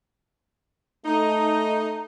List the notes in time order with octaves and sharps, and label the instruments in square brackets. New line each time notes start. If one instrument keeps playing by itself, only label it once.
[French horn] A3 [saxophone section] D#4